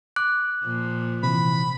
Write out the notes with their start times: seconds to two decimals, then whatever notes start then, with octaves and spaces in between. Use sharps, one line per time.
0.16 D6 F#6
0.63 A#2 F3
1.23 C3 E3 B5